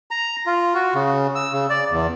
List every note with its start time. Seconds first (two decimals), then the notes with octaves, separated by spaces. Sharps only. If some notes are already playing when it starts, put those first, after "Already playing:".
0.11 A#5
0.46 F4
0.74 F#4
0.95 C#3
1.35 E6
1.52 C#3
1.70 D5
1.91 E2